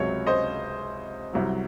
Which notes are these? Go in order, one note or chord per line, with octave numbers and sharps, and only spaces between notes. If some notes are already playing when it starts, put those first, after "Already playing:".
Already playing: C#2 C3 F#3 C#5
C5 D#5
C2 C3 F#3